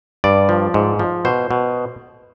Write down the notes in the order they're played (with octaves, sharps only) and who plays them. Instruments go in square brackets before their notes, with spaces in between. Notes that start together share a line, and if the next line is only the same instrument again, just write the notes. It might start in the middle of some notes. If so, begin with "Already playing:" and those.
[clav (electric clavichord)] G2 D5
F3
G#2
F3
B2 C5
B2